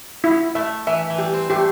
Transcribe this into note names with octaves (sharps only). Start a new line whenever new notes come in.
E4
A3 E5
E3 E5
E3
G3 G4
C4
A3 G4